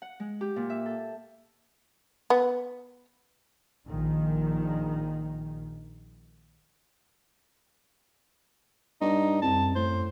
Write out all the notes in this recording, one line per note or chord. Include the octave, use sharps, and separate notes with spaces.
F#5
G#3
G4
A#2
E5
A4
B3
A#1 D#3
G2 D#4
C2 F#2 A5
A2 C5